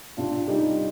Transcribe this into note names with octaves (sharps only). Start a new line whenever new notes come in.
C3 D4 F4
G3 D#4 G4